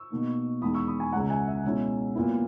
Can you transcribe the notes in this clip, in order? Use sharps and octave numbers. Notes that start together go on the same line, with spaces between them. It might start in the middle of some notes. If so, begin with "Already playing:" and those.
Already playing: C#6 E6
B2 A#3 D#4
E2 D#3 G#3 B5 D#6
C#6 E6
B5 D#6
G#5 B5
C#2 C#3 G#3 F#5 A#5
E5 G#5
E5
B2 G#3 C#4 E4
A#2 F#3 B3 E4